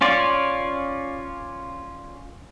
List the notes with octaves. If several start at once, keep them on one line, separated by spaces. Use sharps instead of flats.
C#4 F4 C#5 D5